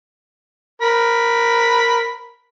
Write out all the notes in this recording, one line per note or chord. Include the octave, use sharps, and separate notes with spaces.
A#4 B5